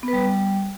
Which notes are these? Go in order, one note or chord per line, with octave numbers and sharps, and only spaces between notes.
B3
B4
G3